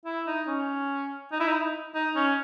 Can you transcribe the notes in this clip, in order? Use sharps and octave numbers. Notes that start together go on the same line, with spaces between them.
E4
D#4
C#4
D#4
E4
D#4
D#4
C#4